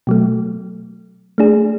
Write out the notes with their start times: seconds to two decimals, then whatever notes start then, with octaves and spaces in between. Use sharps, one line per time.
0.07 B2 F#3 A3
1.38 A3 D4 G#4